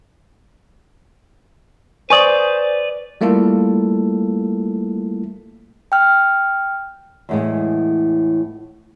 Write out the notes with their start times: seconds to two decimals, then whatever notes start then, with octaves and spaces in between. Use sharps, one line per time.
2.10 B4 C5 D5 G#5 C#6 D#6
3.21 G3 A3 A#3 E4 F4 A4
5.92 G5 F6
7.29 E2 A2 G#3